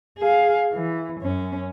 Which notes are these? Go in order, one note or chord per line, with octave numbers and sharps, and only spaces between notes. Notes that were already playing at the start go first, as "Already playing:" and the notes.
G#4 F5
E3
F#2 C#4